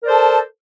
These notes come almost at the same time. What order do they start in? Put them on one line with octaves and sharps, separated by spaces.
A#4 D5 C5 A4 A5